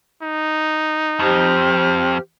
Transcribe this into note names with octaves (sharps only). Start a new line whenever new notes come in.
D#4
F2 G4 C5 F6